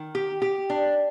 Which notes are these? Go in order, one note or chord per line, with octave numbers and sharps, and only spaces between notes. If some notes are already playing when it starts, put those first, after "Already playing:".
Already playing: D#3
G4
G4
D4